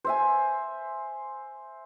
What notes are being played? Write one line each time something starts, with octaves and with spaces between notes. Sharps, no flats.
C5 E5 G#5